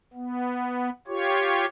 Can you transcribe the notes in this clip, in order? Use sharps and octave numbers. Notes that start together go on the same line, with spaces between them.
B3
F4 G4 C#5